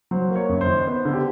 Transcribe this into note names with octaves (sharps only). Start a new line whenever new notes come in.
F#3 C5
A#3
C#5
F#2
C5
D#3
B3 C5
D3
G4